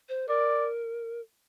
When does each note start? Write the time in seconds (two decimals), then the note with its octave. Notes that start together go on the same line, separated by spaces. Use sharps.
0.09 C5
0.28 A#4 D5